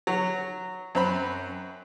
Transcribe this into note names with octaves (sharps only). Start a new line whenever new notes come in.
F#3
F#2 C4 B5